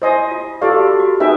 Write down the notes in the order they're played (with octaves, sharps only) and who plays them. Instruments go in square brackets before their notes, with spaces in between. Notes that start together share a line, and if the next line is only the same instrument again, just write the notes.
[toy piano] E4 [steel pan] C5 D#5 G#5 C6
[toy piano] F4
[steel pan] F4 A4 D5 F5 [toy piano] G4
[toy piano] F#4
F4
F#4
[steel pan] D#4 G#4 B4 E5 G5